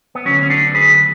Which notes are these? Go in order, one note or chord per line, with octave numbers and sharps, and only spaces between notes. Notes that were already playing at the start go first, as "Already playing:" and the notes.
B3
D2 D3 F#3 C#4
C#4
B3 D4
G#4 B4